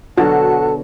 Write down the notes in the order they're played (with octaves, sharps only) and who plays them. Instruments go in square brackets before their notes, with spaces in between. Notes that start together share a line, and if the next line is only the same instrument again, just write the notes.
[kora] B2 D3 F#3 [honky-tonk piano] F#4 [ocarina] A4 [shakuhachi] A5